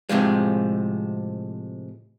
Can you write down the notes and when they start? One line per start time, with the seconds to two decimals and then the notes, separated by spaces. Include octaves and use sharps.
0.09 A2 C3 F3 G#3